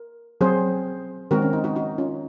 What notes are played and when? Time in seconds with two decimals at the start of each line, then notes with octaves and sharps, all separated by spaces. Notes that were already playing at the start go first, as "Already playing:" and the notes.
Already playing: A#4
0.41 F#3 C4 G#4 C5
1.31 D#3 G#3 C4 F#4 A#4
1.42 C#4
1.53 D#4
1.64 D#4 F#4
1.76 D#4 F#4
1.98 C#4 F4